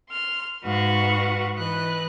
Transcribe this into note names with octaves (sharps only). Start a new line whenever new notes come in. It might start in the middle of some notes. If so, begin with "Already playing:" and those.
C6 F6
G#2 F#4 B4 F5 F#5 C#6
E3 B4 D#5 F#6